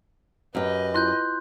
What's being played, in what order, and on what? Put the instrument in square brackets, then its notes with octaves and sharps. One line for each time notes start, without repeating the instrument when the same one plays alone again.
[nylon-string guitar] F#2 G4 [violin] B4 D#5
[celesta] E4 F4 [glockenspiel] C6 F#6 G6